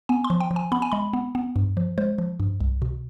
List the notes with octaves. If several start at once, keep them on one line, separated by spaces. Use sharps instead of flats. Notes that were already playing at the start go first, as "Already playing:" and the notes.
B3 G#5
C6
F3
G5
F3
G#5
B3 B5
G#5
G#3 B5
B3
B3
G2
F3
G#3 C5
F3
G2
C2
B2